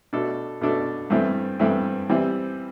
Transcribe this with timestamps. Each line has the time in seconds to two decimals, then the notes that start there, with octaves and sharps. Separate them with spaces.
0.13 B2 A3 D4 A4
0.61 B2 A3 D4 A4
1.10 G2 E3 A3 C4 E4
1.59 G2 E3 A3 C4 E4
2.10 E3 G3 C4 E4